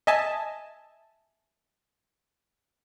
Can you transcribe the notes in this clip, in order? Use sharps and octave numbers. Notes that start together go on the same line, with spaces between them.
D#5 E5 G#5 A5